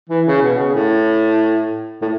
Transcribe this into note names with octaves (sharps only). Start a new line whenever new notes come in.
E3
C#3
B2
C#3
A2
A2